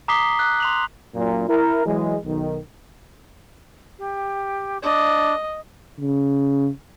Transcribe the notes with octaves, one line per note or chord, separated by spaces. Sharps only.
A#5 D6 D#6 B6 C7 G7
F#6
C6 F7 F#7
F#2 A#2
E4 A#4
E3 F#3 G#3
B1 D#3
G4
D4 D#5
C#3